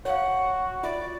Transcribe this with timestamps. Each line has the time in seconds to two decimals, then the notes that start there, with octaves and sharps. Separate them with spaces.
0.05 F#4 C#5 F5 F#5
0.83 F4 D5 E5